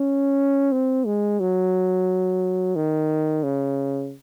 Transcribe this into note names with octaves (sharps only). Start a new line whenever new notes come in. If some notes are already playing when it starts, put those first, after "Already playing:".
Already playing: C#4
C4
G#3
F#3
D#3
C#3